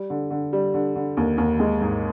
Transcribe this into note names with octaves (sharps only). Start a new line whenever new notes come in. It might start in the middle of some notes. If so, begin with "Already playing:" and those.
Already playing: G3
D3
D3
G3
D3
D3
D#2
D#2
G#3
G#2